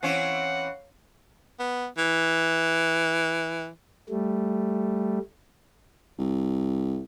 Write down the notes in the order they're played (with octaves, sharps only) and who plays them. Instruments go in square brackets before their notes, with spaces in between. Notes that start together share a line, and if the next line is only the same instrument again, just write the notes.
[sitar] E3 C4 C#4 [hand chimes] C#5 F5 C7 [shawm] F#5
[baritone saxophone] B3
E3
[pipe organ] G3 A3
[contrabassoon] C2